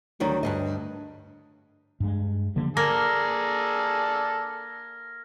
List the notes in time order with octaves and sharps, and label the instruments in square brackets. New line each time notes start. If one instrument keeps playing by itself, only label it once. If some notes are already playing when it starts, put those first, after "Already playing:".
[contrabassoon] D2 [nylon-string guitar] D#3 F#3 G3
[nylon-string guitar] G2 C3 D#5
[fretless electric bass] G2 G#3
D3 F3 G3 A#3
[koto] A#3 [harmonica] G#4 A4 D5 [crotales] F6 G#6 A#6